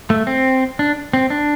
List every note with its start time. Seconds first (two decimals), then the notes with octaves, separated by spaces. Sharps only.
0.10 A3
0.27 C4
0.79 D4
1.13 C4
1.30 D4